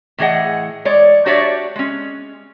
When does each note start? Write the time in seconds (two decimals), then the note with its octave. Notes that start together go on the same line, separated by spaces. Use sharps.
0.18 A2 E3 G#4 D#5 F#5
0.85 G#3 C#5 D5
1.26 D4 F#4 G4 C#5 D5 E5
1.76 G#3 C#4